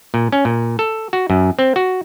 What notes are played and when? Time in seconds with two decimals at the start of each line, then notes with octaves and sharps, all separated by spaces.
0.14 A#2
0.32 C#4
0.45 A#2
0.79 A4
1.13 F#4
1.30 F#2
1.59 C4
1.76 F#4